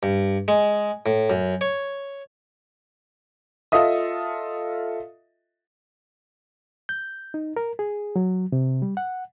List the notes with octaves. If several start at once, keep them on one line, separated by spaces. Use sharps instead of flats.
G2
G#3
A2
F#2
C#5
F4 A4 D#5 E5 D#6
G6
D#4
A#4
G#4
F#3
C3
G3
F#5